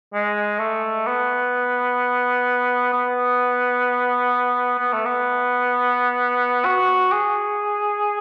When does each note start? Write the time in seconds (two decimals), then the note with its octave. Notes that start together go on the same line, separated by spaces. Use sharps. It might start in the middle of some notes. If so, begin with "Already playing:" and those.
0.14 G#3
0.59 A3
1.06 B3
2.93 B3
4.79 B3
4.93 A3
5.05 B3
6.65 F#4
7.12 G#4